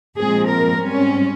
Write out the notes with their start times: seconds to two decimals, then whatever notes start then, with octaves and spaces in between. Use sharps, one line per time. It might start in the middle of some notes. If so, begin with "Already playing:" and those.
0.19 A#2 F3 G#3 C4 G#4
0.50 A#4
0.82 G#2 G3 C4 C#4